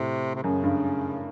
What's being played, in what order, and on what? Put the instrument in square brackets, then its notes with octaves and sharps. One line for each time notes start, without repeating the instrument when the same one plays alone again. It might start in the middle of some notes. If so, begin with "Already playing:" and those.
Already playing: [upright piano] A2 [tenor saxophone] C3
[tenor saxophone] C3
[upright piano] F#2 [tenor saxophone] C#3
[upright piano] G2